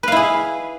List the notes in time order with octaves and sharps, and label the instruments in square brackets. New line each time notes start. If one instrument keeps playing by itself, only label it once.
[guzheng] B4
F5
E4
G#4